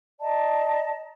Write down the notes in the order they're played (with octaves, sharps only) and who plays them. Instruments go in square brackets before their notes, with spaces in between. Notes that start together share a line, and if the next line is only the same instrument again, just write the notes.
[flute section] D5 D#5 A5 A#5